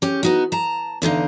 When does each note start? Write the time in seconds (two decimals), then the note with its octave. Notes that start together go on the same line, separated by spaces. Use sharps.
0.02 C#4 G4
0.23 B3 D#4 F#4
0.52 A5 A#5
1.02 E2 D3 D#4 F5